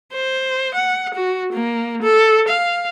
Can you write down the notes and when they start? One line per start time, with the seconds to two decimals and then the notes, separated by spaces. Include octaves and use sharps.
0.13 C5
0.74 F#5
1.14 F#4
1.52 A#3
2.02 A4
2.48 F5